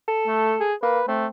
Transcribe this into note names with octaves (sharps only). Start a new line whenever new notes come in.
A4
A3
G#4
A#3 B4
A3 C4